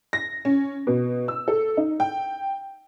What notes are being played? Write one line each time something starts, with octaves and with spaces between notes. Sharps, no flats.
A#6
C#4
B2
E6
A4
D#4
G5